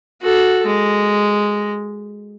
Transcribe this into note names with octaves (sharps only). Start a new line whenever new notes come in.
F#4 A4
G#3